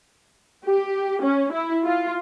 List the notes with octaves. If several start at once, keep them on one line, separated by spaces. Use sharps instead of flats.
G4
C#4
E4
F4